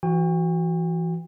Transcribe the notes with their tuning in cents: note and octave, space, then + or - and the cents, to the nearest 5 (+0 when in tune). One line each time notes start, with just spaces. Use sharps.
E3 +25 F#4 +0 G5 +40